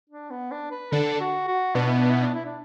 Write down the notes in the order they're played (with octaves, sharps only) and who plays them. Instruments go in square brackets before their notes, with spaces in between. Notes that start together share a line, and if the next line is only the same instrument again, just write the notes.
[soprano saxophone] D4
B3
D4
B4
[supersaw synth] D3 D4 [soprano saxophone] A4
[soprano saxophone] F#4
F#4
[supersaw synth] B2 B3 [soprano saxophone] D4
[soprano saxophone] E4
D4
E4
D4
E4
D4